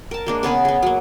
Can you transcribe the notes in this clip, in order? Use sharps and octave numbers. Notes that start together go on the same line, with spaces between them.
A#4 A5
G#3 A#3 D4
C#3 B3 G#4 B4
B3 G#4
F#3 A#3